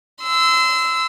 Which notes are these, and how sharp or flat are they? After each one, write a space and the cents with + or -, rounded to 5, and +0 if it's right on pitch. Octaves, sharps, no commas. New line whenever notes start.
C6 -30 E6 +0